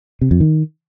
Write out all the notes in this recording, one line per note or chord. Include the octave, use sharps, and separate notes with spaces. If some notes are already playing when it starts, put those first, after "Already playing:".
C3
F2
D#3